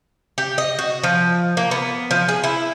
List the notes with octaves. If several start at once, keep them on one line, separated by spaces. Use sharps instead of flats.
G4
D#5
F#4
F3
A#3
B3
F3
G#4
E4